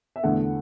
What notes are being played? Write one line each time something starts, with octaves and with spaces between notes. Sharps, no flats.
E5
E2 D3 A3 F#5